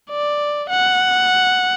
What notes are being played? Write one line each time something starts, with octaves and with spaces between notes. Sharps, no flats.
D5
F#5